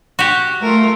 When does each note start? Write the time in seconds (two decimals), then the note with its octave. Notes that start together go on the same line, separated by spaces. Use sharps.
0.19 F#4 G4
0.62 A3 F4 A#4